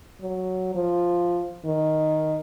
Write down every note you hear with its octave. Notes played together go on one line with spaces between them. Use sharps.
F#3
F3
D#3